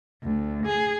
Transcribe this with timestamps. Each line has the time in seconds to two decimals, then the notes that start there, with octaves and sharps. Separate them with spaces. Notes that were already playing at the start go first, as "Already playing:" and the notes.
0.23 D2
0.66 G#4